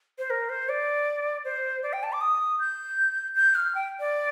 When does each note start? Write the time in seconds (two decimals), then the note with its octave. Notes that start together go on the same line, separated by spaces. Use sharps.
0.19 C5
0.30 A#4
0.49 C5
0.69 D5
1.45 C5
1.83 D5
1.93 G5
2.03 A5
2.13 D6
2.21 D#6
2.60 G6
3.36 G6
3.55 F6
3.75 G5
4.00 D5